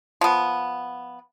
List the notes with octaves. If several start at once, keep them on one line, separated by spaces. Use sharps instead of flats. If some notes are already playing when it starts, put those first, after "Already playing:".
F3 B3